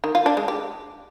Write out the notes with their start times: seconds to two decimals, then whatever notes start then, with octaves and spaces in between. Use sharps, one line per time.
0.04 D#3
0.15 F4
0.26 D4
0.37 G#3
0.48 G4